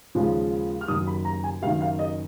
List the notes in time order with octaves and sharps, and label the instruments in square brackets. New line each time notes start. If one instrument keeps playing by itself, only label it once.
[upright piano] D#2 C#3 F3 G#3
F6
F#1 F#2 D#3 D#6
B5
A#5
G#5
F#1 F#2 D#3 F5
F5
D#5